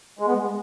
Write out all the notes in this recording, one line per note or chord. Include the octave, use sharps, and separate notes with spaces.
G#3
B3
G#3